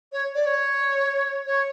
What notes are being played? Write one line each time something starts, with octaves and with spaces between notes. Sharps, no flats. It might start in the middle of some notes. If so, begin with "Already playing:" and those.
C#5
D5
C#5
C#5